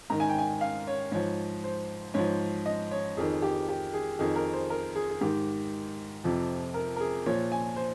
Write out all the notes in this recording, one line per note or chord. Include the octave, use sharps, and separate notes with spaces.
G#2 D#3 A#5
G#5
G5
G#5
F5
C#5
G#2 F3 C#5
C5
G#2 F3 C#5
D#5
C#5
F2 D#3 G#4
G4
G4
G#4
F2 D#3 G#4
A#4
C5
A#4
G#4
G#4
G#2 D#3 G4
F2 C3 F3
A#4
A#4
G#4
A#2 F3 C#5
G#5
C5